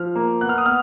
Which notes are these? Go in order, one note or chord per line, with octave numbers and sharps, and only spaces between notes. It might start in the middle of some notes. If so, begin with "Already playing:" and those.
Already playing: F3 F6
A#3
B3 F#6
F6
D#6
B3 F6